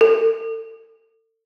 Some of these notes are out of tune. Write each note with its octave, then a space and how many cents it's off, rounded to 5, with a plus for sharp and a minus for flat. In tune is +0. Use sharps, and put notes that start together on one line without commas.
A4 +35